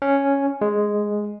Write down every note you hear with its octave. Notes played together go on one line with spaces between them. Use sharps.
C#4
G#3